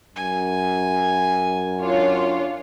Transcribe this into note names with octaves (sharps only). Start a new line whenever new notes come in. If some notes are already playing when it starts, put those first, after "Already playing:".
F#2 G#5
D4 F4 C#5